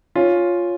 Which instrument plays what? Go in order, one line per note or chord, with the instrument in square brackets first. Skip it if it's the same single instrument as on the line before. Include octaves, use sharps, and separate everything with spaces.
[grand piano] C#4 F4